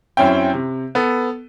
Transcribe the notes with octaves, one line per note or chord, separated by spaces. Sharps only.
F#2 C4 C#4 E4 G5
C3
B3 A4